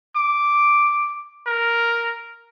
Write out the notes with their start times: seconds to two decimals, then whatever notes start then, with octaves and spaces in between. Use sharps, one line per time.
0.16 D6
1.47 A#4